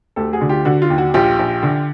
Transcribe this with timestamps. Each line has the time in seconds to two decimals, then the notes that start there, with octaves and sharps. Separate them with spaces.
0.16 D2 G4 A4
0.33 F#4 G#4
0.41 D3
0.49 F4 G4
0.65 D3 F#4
0.82 F4
0.90 D#2
0.98 F#4
1.14 A#1 F4 G4
1.39 A#1
1.63 D3